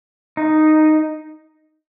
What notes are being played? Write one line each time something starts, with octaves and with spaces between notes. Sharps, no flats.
D#4